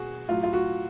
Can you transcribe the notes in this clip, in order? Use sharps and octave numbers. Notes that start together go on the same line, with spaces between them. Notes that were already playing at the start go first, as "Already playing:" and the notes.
Already playing: B2 F#4 G#4
A2 F#3 F4
F4
F#4